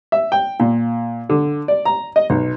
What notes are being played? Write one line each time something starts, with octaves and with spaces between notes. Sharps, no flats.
E5
G5
A#2
D3
D5
A#5
D#5
B1